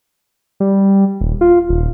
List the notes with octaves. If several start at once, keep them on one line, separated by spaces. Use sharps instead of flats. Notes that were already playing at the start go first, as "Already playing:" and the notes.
G3
D#1
F4
D#1